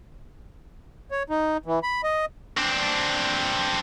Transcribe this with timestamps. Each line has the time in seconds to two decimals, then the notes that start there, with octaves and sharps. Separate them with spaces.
1.11 C#5
1.30 D#4
1.66 E3
1.83 B5
2.04 D#5
2.57 C4 D4